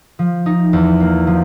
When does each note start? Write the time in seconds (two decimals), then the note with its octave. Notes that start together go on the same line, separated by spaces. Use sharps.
0.19 F3
0.46 D#4
0.73 E2
1.00 A#3
1.27 F3